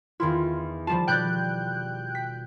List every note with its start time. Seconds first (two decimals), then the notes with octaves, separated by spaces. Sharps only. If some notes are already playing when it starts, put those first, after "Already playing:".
0.20 E2 D#3 E4 F4
0.87 F3 G3 F4 A5
1.07 B2 G4 D5 G5 F#6 G6
2.15 B6